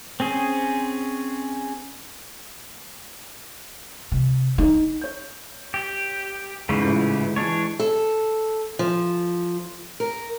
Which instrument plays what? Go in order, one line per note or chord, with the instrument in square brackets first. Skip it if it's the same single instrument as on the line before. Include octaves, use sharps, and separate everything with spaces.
[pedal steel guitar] C4 C#4 G#4
[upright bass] C3
D#4
[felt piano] C#5 G6
[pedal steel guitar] G4
[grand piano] G#2 [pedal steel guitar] C#3 E3 A3
[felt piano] A1 F4 G6
[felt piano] E3 G#3 [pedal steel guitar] D4 C#5
[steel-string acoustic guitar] A4
F3
A#4